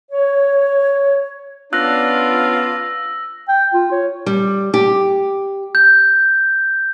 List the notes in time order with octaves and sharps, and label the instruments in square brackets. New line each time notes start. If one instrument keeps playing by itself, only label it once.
[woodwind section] C#5
[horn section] B3 C#4 D4 [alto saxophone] F4 [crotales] E6 A#6 [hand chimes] F#6
[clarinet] G5
F4
C#5
[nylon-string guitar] G3
G4
[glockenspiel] G6